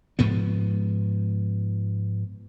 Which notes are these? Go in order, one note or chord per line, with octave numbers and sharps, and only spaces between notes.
G#2 F3 B3